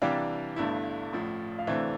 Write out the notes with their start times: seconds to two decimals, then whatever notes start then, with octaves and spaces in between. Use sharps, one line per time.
0.02 C3 E3 G3 D4 G4 D5 F5
0.56 G1 G2 D3 A3 E4
1.12 A1 A2 F3
1.59 F5
1.67 D2 C3 E3 A3 D4 C5 E5